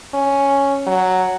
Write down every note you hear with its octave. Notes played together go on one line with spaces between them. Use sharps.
C#4
F#3